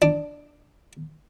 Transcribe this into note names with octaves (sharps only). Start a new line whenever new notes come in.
D4